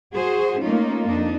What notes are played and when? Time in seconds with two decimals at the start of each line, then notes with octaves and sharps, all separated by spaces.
0.13 F#4 G#4 C5
0.61 A3 A#3 C#4 D#4 F4
1.07 F2 D4 D#4